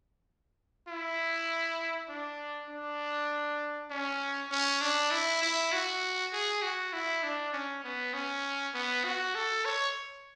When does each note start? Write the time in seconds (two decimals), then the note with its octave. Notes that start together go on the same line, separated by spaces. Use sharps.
0.88 E4
2.09 D4
2.70 D4
3.91 C#4
4.51 C#4
4.82 D4
5.11 E4
5.42 E4
5.72 F#4
6.33 G#4
6.62 F#4
6.93 E4
7.23 D4
7.53 C#4
7.84 B3
8.14 C#4
8.74 B3
9.05 F#4
9.35 A4
9.65 C#5